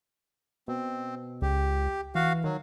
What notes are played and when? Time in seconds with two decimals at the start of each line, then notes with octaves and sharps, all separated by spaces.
0.68 B2 C4
1.42 C#2 G4
2.15 E3 F#4 F5
2.44 D#3 F#3